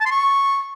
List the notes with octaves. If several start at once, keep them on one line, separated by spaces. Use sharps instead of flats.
A5
C6
C#6